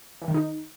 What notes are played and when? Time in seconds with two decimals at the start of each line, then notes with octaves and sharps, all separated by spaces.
0.22 E3
0.28 D#3
0.34 D#4